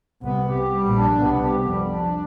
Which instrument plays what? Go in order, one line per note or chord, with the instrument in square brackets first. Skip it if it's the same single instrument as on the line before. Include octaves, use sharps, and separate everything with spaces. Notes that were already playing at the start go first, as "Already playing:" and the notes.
[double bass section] C2 C3 [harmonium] B3
[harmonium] G4
G3
[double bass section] A#1 A#2
[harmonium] D4
[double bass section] C2 C3 [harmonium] B3
[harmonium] G4
[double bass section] F2 F3 [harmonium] G3
[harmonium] D4